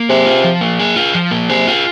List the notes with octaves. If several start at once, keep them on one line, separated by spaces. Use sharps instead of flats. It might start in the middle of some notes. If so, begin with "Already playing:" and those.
Already playing: A#3
C3 G#4
F4
F3
A#3
G#4
F4
F3
A#3
C3 G#4
F4